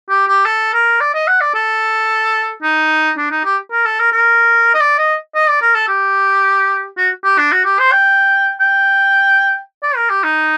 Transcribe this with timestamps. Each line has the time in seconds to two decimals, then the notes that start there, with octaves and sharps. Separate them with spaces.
0.09 G4
0.28 G4
0.45 A4
0.73 A#4
1.01 D5
1.14 D#5
1.27 F#5
1.41 D5
1.55 A4
2.63 D#4
3.17 D4
3.31 D#4
3.45 G4
3.71 A#4
3.85 A4
3.99 A#4
4.12 A#4
4.74 D#5
4.81 D5
4.99 D#5
5.35 D#5
5.49 D5
5.62 A#4
5.75 A4
5.88 G4
6.98 F#4
7.24 G4
7.38 D4
7.52 F#4
7.65 G4
7.79 C5
7.92 G5
8.60 G5
9.83 D5
9.96 A#4
10.10 G4
10.24 D#4